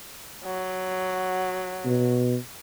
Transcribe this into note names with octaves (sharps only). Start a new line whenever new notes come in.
F#3
B2